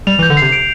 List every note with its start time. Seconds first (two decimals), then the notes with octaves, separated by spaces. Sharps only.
0.07 G3 F7
0.19 E3
0.23 G6
0.30 D3
0.37 C3 C7
0.52 D7